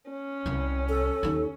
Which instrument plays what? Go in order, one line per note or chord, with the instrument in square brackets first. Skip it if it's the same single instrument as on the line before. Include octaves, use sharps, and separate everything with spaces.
[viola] C#4
[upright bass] C2 C3
[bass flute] A4
[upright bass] D#2 D#3